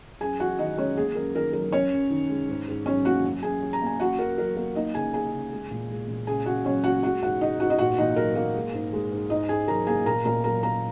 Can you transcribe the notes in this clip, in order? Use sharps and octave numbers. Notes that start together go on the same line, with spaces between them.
F#2 G#4 G#5
F#2 F#4 F#5
D#3 D#4 D#5
G#3 C#4 C#5
A#3 G#4
F#2 A#4
D#3 A#4
F#3 A#4
F#2 C#4 C#5
F#2
D#3
G#3
G#2
G#2
F#3 C#4 C#5
A#3 F#4 F#5
F#2
F#2 G#4 G#5
F#3
A#5
A#3 G#5
F#2 F#4 F#5
F#2 A#4
F#3 A#4
A#3 A#4
A#3 D#4 D#5
C#3 G#4 G#5
A#3 G#4 G#5
C#3
G#3
A#2
G#3
A#2
C#3 G#4 G#5
C#3 F#4 F#5
F#3 C#4 C#5
A#3 F#4 F#5
G#3 F#4 F#5
G#2 F#4 F#5
G#3 D#4 D#5
G#2 F#4 F#5
D#4 D#5
A#2 F#4 F#5
A#2 D#4 D#5
F#3 A#4
A#3 A#4
G#3
G#2
G#3
G#2
G#2 D#4 D#5
G#2 G#4 G#5
F#3 A#4 A#5
A#3 G#4 G#5
A#2 A#4 A#5
A#2 A#4 A#5
F#3 A#4 A#5
A#3 A#4 A#5